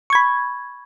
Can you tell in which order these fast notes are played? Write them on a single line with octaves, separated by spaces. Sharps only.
C#6 G#6 B5